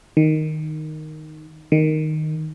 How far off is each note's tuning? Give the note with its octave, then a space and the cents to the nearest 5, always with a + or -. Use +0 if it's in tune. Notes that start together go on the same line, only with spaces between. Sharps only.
D#3 -5
D#3 -5